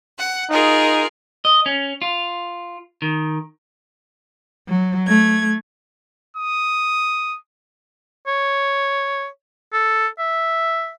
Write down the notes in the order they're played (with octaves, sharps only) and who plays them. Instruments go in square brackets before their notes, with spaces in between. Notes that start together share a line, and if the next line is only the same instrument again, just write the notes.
[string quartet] F#5
[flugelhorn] D#4 [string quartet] F4 G#4 A#4
[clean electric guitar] D#5
C#4
F4
D#3
[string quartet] F#3
A3 G#6
[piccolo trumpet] D#6
[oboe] C#5
A4
E5